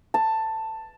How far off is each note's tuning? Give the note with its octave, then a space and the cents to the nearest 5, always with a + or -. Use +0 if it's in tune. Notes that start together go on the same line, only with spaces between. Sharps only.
A5 +10